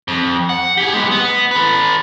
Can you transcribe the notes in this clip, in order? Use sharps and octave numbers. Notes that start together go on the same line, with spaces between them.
F2
F#5
G4 G#4
G#3 B3
B3
A4 B4